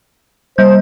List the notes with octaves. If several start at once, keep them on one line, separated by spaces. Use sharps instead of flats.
G3 C5 G6